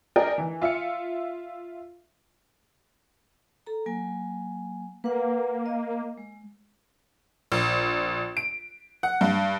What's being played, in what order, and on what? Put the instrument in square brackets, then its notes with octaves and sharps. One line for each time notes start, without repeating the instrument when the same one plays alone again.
[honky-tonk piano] D4 G#4 A#4 D#5 G5
E3
F4 E5 F6 C#7
[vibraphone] A4 A#5
F#3 A#3 G#5
[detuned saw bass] A#3 [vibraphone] B4 F#5
[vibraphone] D#5
G#3
[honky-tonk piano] A#1
D7
F#5
G2